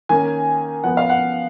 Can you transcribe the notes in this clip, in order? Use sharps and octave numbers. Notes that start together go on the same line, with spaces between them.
D#3 A#3 C#4 G#5
F3 B3 F#5
F5
F#5